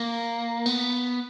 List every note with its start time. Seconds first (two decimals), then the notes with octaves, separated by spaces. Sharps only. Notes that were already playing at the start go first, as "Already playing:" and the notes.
Already playing: A#3
0.66 B3